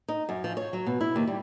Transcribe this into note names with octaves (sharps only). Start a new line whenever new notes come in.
D#4
F#2
F3
C#5
F#3
B2
E4
D#2
G3